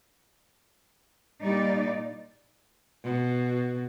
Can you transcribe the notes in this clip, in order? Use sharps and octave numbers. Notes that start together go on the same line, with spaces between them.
A#2 G3 D#4 D5
B2